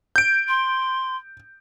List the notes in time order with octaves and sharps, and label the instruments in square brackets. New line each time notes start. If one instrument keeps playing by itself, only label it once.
[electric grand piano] G6 D7
[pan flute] C6